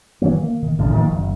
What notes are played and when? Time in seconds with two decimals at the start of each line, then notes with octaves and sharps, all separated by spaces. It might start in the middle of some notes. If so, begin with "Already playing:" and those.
0.22 D#3 E3 F#3 A#3
0.43 A#3
0.62 D#3
0.78 A1 A2 D3
0.94 D#3 F3 A#3
1.10 F#1